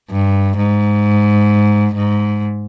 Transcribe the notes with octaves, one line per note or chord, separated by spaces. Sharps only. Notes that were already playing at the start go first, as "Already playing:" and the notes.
G2
G#2
G#2